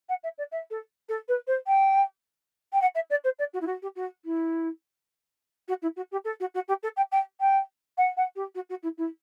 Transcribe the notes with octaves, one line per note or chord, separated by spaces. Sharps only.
F#5
E5
D5
E5
A4
A4
B4
C5
G5
G5
F#5
E5
D5
C5
D5
F#4
E4
F#4
G4
F#4
E4
F#4
E4
F#4
G4
A4
F#4
F#4
G4
A4
G5
G5
G5
F#5
F#5
G4
F#4
F#4
E4
E4